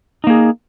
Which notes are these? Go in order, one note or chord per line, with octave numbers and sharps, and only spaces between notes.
A#3 D#4 G#4